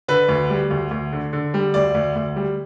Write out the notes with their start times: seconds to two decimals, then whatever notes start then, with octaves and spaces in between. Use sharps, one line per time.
0.08 D3 B4
0.29 D2
0.50 G3
0.71 D2
0.91 D2
1.12 D3
1.33 D3
1.54 G3
1.74 D2 D5
1.94 D2
2.15 D2
2.36 G3